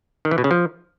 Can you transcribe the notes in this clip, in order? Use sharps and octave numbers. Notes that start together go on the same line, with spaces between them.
D#3
E3
B2
C#3
F3